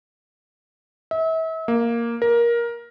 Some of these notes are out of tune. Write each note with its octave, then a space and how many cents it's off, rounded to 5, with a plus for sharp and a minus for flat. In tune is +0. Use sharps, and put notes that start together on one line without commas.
E5 -35
A#3 +0
A#4 +15